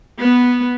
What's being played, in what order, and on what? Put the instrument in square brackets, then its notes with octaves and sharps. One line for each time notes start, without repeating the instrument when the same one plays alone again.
[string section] B3